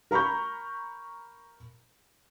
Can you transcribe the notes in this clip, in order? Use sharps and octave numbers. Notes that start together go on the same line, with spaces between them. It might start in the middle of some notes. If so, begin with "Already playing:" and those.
A#4 A#5 B5 C#6 G6